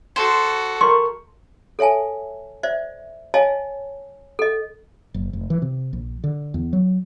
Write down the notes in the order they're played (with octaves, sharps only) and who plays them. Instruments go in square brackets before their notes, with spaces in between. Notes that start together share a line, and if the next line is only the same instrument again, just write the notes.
[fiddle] F#4 A4 [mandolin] C5
[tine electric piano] A#4 C#6 [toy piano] C6
[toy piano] A4 C#5 E5 G#5 A5
C5 D5 E5
C#5 D#5 F5 G#5 A5
A4 D#5
[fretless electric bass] F#1
F1
E3
C3
A#1
D3
E2
F#3